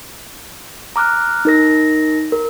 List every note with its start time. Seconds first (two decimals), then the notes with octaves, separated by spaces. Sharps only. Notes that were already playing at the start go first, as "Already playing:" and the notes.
0.96 A#5 D6 F6 F#6
1.45 D#4 A#4 A#6
2.32 A#4